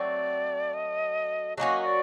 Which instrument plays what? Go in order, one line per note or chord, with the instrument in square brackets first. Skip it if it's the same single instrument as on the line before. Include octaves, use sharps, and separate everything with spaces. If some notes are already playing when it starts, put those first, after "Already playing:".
Already playing: [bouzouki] F#3 A3 C4 [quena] D5
[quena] D#5
[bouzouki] F#3 A#3 C#4 F#4 [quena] D#5
[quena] D5